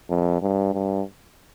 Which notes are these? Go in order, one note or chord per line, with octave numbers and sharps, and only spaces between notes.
F2
G2
G2